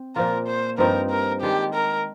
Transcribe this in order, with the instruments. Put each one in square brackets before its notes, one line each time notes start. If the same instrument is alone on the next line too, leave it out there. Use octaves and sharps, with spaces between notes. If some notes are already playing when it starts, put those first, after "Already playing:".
Already playing: [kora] C4
[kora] A#2 F3 A#3 F4 [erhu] A#4
[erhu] C5
[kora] G2 F3 C4 D#4 [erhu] A#4
[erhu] A#4
[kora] D#3 G#3 D4 [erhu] G4
[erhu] A#4